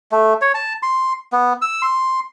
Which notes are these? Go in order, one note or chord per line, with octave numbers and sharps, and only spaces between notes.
A3
C#5
A5
C6
B3
E6
C6